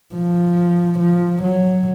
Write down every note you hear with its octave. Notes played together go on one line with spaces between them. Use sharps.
F3
F3
F#3